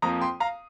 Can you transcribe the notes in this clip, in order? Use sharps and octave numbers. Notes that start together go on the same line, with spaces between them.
F2 F3 A#3 A#5 D#6
G5 C6
F5 A#5